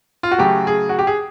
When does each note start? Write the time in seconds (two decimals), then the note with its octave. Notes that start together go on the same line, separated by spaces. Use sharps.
0.23 F4
0.31 F#4
0.38 C#3 F#3 A3 G4
0.67 G#4
0.89 F#4
0.99 G4
1.07 G#4